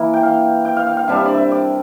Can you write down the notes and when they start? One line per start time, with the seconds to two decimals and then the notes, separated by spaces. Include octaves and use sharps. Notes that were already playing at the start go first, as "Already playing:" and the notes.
Already playing: E3 A#3 E4
0.13 G5
0.23 F5
0.65 G5
0.76 F5
0.87 F5
0.97 F5
1.08 C3 G3 D4 F5
1.16 E5
1.26 D5
1.34 E5
1.52 D5